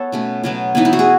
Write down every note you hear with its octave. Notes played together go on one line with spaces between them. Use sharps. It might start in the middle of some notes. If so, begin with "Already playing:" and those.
Already playing: B3 A4 C#5
B2 A3 C#4
B2 F#3 B3
E3 B3 D#4
E4
F#4
G#4